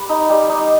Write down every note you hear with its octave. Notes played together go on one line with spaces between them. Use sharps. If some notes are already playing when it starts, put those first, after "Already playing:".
Already playing: G3 G4 B4
D#4
G3
D#4